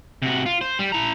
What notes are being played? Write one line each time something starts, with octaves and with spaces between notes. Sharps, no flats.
C3 F#4
F4
C5
G3
E4 A#5